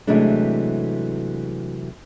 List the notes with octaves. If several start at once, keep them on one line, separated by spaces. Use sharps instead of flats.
C3 E3 F#3 G#3 A3 D4